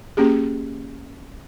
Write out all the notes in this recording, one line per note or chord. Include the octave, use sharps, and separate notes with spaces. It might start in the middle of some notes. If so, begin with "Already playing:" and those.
A#3 C#4 G4 G#4